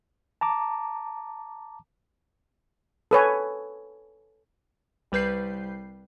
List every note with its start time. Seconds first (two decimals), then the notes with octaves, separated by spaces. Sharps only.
0.41 A5 A#5 D6
3.11 A4 B4 C#5 G#5
5.12 C2 G3 B4 G6 C7